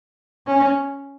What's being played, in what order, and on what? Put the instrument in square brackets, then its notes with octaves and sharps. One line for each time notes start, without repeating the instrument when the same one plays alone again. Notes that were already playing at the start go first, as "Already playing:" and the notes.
[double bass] C#4